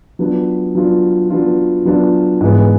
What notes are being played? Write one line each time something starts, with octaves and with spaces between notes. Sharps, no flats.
F#3 B3 D4 F4
F#3 B3 D4 F4
F#3 B3 D4 F4
F#3 B3 D4 F4
G#2 E3 G#3 B3